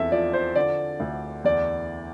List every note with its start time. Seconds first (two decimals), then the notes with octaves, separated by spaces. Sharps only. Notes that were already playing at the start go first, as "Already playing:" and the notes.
Already playing: F1 E2 A4 E5
0.12 F3 D5
0.33 C5
0.55 D3 D5
1.00 D2
1.44 E2 D5